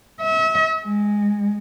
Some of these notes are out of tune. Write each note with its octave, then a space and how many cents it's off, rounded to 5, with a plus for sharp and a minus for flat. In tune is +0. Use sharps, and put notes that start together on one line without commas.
E5 -35
G#3 -5